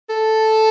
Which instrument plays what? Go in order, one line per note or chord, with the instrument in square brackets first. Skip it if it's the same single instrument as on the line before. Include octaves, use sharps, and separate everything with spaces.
[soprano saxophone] A4